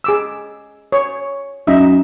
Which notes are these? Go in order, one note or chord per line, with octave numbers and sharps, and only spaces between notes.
G#4 D6 E6
C#5
F#2 D#4 D#5 E5